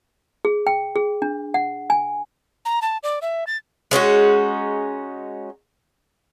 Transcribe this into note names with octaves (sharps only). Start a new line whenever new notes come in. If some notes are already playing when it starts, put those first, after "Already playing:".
G#4
G5
G#4
D4
F#5
G#5
A#5
A5
D5
E5
A6
G#3 C#4 D#4 F#4